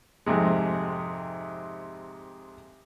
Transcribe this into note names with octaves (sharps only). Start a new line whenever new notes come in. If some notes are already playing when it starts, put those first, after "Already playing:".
F2 G#2 C3 G#3